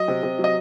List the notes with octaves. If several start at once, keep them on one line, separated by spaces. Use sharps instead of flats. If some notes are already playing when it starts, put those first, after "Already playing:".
Already playing: F#3 D#5
C3
C3
F#3
D#5